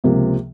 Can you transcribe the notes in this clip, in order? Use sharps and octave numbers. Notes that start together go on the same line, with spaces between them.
C#2 C3 F3 A#3